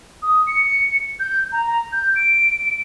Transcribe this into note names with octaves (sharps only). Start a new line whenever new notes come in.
D#6
C#7
G6
A#5
G6
D7